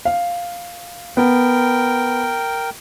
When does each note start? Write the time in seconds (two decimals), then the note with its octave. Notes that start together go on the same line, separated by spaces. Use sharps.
0.05 F5
1.17 B3 A#4 G5